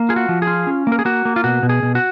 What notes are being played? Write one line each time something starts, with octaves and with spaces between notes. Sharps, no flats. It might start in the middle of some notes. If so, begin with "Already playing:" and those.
Already playing: A#3
F4 G#4
F#4
F3
G#4
F4
C#4
A#3
A#4
G#4
A#3 F#4
A#3
F4
B2 F#4
B2
G#4
B2
F#4